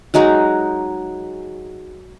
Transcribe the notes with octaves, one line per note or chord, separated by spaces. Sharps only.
F#3 G#3 D#4 F#4